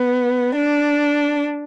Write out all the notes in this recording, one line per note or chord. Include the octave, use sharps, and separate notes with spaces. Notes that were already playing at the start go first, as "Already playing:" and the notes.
Already playing: B3
D4